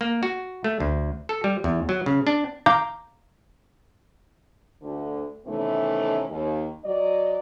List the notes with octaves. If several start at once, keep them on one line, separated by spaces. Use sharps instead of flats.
A#3
F#4
A3
D2
A4
G3
E2
F#3
C#3
D4
F5 A#5 D6 G6
D2 D3
C3 D#3 E3 A3 B3 C#4
D#2
F#3 D5 D#5